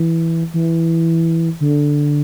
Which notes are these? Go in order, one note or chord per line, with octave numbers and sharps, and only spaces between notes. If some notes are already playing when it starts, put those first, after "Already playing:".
Already playing: E3
E3
D3